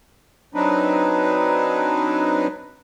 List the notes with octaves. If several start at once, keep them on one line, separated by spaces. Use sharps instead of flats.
F#3 C4 D4 D#4 B4